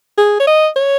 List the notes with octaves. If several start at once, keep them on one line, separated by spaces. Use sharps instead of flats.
G#4
C#5
D#5
C#5